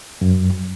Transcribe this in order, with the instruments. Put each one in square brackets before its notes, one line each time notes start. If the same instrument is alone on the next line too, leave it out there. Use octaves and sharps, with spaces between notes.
[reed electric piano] F#2